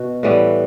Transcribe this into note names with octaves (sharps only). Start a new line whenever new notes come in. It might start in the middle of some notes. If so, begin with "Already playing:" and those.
Already playing: B2 F#4
A2 E3 G3 B3